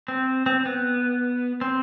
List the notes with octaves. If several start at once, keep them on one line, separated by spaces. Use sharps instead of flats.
C4
C4
B3
C4